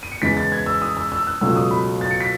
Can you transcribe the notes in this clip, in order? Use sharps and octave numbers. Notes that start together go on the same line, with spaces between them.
D#7
C#7
E2 C#3 E3 G#3 B6
A6
G#6
E6
D#6
E6
E6
F#6
C#2 B2 F#3 A3 E6
D#6
B5
A6
C#7
B6